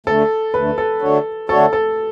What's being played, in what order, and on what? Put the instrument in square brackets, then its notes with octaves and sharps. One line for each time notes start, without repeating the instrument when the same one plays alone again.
[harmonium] D2 D3 A3 [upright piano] A4
[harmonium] D2 D3 A3 [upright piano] B4
[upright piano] A4
[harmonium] D3 A3 D4 F#4 C#5
[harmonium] D3 A3 D4 F#4 C#5 [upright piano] A4
[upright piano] A4